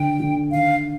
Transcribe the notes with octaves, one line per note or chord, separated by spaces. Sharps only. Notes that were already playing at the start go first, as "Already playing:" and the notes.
Already playing: D3 G5
D3
D#3 F5